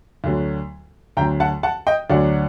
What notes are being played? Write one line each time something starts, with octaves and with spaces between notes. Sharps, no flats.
D2 D3 F#3
D2 D3 F#3 G5 A#5
F#5 A5
F#5 A5
D#5 G5
D2 D3 F#3 D5 F#5